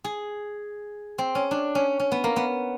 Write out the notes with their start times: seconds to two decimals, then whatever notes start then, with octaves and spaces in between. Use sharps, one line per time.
0.04 G#4
1.18 C4
1.35 C#4
1.51 D4
1.75 C#4
2.00 C#4
2.12 B3
2.24 A#3
2.36 B3